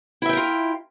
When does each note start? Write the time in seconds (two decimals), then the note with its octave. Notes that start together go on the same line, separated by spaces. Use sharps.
0.22 E4
0.26 E5
0.29 G5
0.33 A#4
0.37 F4